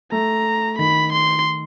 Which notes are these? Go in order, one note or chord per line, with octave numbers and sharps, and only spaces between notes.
A3 A#5
D#3 B5
C6